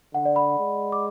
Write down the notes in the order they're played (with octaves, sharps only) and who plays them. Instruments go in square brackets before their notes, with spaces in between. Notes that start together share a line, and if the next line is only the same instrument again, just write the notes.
[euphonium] D3 [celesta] F#5
[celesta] D5
B5
[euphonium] G#3
[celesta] D6